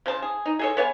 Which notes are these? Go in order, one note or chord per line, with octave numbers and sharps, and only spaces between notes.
C#3 C5 A5
G#4
D#4
G#4 A4 C#5
B3 C#5 F5 G#5